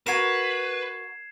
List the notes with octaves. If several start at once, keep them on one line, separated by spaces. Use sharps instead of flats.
F#4 A#4 B4 G#6 C7 E7